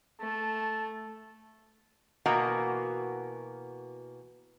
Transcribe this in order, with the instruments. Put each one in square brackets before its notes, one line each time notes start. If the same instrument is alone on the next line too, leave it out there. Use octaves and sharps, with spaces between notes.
[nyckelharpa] A3 [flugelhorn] A5
[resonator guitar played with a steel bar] B2 E3 A#3 F#4 A#5